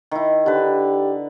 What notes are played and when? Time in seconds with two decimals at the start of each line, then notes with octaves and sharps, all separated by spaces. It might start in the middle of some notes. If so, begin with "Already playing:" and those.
0.11 D#3 E4
0.46 D3 G4 B4